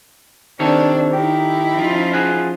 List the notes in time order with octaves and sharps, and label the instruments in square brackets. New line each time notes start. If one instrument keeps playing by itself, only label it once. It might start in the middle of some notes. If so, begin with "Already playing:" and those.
[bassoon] C3 [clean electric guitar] D#3 A4 C#5 [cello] D4
[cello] D#4 E4 [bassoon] G4
[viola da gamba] F3 C#4 F4
[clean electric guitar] F#4 G#4